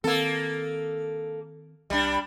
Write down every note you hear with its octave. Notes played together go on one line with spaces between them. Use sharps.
D#3 A#3 C4 A4
C2 G3 D4